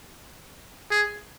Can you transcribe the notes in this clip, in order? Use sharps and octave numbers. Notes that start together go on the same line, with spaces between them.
G#4